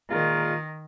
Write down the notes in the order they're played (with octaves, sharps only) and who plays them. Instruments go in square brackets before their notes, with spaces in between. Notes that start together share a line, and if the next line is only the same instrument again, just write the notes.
[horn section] A#2 G#3 F4 A#4 [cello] D#3